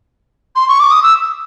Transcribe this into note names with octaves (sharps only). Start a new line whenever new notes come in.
C6
C#6
D6
D#6
E6